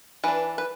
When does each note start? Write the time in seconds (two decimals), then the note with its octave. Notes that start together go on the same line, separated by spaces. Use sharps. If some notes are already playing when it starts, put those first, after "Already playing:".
0.24 E3 D4 B4
0.58 B4